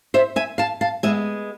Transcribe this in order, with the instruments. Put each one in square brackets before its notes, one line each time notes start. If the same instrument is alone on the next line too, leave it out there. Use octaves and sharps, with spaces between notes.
[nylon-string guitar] C5 E5
E5 G#5
F5 A5
F5 A5
G#3 B3 E5 G#5